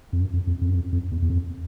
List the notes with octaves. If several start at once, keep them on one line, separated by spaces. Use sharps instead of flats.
F2
F#2
F2
F2
F2
F#2
F2
F2
E2
E2
F2